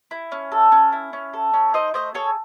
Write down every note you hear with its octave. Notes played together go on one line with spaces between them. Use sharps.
E4
C#4
A4
C#4
E4
C#4
A4
C#4
D#4 C5 D#5
A3 C5 D#5
G#4 A4 C#5